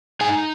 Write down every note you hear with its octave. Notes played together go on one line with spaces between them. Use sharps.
D#4 G#4 G#5